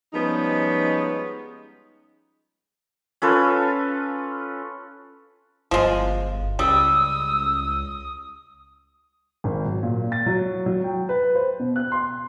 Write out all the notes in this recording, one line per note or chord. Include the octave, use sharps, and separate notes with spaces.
F3 G3 G#3 B3 C#4 D#4
C#4 F4 A4 B4
G1 F3 G#3
C#2 G3 D#6 E6
G#1
F#3
A#2
A6
F#3
F#3
G5
B4
C5
B2
F#6
C6